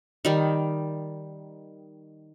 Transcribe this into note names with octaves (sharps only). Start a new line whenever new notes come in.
D#3 G3